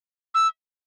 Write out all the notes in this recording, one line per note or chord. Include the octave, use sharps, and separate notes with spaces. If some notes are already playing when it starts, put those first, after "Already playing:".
E6